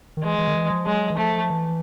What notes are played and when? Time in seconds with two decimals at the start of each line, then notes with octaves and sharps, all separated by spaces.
0.17 D#3
0.23 E3 G#3
0.39 E3
0.48 D#3
0.55 E3
0.70 F3
0.86 F#3 G#3
1.10 E3
1.18 F3 A3
1.50 E3